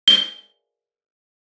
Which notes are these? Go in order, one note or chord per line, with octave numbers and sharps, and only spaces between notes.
G7